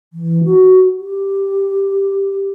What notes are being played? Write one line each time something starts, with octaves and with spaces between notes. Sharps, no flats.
E3
F#4
G4